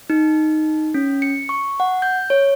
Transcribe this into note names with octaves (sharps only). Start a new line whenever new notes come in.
D#4
C#4
C#7
C#6
F#5
G6
C#5